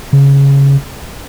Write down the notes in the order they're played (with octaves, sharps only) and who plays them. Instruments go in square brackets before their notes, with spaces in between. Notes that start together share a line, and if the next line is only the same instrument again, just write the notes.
[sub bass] C#3